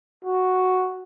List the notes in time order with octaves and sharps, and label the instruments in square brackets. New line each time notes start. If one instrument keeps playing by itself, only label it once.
[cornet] F#4